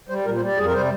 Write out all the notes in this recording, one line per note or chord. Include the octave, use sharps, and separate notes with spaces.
G3 C5
A#2 A#4
C5
G3 D5
F2 G#4
A#4
C3 G3 C5